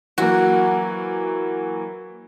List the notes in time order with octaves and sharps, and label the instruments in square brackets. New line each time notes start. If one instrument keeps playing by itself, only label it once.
[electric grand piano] E3 F#3 A#3 [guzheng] F#4